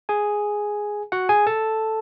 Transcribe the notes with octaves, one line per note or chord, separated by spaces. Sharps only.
G#4 G#5
F#4 F#5
G#4 G#5
A4 A5